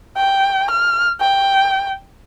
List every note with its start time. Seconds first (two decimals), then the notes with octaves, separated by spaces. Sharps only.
0.17 G5
0.71 F6
1.21 G5